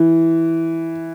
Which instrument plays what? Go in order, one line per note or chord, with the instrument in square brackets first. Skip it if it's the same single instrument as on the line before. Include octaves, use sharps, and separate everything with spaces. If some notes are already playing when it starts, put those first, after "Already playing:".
Already playing: [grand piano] E3